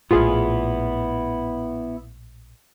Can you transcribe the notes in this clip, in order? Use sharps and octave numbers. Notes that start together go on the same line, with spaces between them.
A#1 A2 B3 E4 F4 G#4